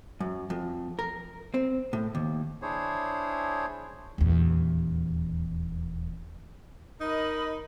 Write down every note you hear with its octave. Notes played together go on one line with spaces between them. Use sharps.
F#2
F2
A#4
C4
A2
D#2
D4 E4 G#4 C5 C#5
D#1 E2
D#4 A#4 D#5 B5